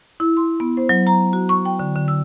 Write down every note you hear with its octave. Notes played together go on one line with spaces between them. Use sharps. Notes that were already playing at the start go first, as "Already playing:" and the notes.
E4
C6
B3
C5
F#3
A#5
F#4
C#6
G5
D3
D3
E6